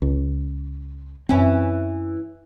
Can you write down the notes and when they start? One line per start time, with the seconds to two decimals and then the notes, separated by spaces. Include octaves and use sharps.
0.02 C#2
1.29 F#2 E3 C4 C#4 E4